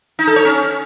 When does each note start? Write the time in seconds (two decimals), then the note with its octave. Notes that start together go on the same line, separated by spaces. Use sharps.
0.19 D#4
0.27 A4
0.36 C#5
0.45 C#4